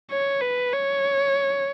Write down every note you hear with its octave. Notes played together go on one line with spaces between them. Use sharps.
C#5
B4
C#5